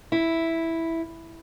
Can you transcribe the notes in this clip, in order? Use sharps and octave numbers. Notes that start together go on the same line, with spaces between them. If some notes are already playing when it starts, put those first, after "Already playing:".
E4